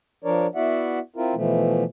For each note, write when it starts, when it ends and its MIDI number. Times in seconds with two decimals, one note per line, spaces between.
0.24 0.47 53
0.24 0.47 62
0.24 0.47 70
0.24 0.47 73
0.24 0.47 74
0.55 0.99 59
0.55 0.99 64
0.55 0.99 66
0.55 0.99 74
0.55 0.99 76
0.55 0.99 78
1.16 1.34 60
1.16 1.34 64
1.16 1.34 65
1.16 1.34 70
1.35 1.84 47
1.35 1.84 52
1.35 1.84 53
1.35 1.84 57